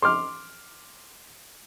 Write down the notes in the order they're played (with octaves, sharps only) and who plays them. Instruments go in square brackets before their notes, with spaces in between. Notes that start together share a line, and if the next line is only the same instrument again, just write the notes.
[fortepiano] C6 D6 F6